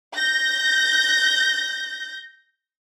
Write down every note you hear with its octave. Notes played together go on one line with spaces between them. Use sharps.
G6 A#6